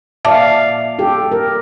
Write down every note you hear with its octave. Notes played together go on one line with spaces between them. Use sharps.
A#2 D5 E5 F5 A5 D6
G4 A4
A#4